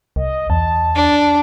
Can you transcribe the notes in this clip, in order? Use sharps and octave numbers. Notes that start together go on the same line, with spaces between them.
C2 D#5
E2 A5
D4